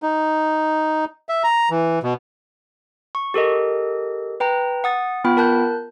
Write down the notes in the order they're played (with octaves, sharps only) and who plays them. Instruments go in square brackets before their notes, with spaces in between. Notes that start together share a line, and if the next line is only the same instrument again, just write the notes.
[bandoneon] D#4
E5
A#5
E3
B2
[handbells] C#6
G4 A4 A#4 D#5
B4 G5 A#5
F#5 D#6 A6
B3 F4 G5 B5
A#4 A5 F#6 G6